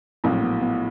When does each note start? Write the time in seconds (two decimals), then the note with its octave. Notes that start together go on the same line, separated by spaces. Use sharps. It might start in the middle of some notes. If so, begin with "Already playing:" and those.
0.24 A#1 A2 F#3 C4
0.43 B3
0.62 B3